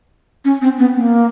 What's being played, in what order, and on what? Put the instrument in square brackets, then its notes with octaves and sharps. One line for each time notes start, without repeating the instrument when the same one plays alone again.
[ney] C#4
C4
B3
A#3